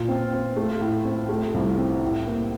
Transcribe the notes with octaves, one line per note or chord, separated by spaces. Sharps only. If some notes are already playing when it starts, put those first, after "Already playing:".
Already playing: A#2 F4
C4
C4
A3
A2
C4
A3
C2
C4
A2
A#3